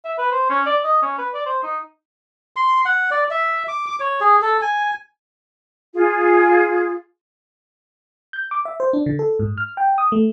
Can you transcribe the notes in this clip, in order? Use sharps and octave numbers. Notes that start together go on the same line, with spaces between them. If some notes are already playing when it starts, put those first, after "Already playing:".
E5
B4
C5
C#4
D5
D#5
C#4
B4
D5
C5
D#4
C6
F#5
D5
E5
D6
D6
C#5
G#4
A4
G#5
F4 G#4
G6
D6
E5
C5
D4
D3
A4
G#2
F6
G5
D#6
A3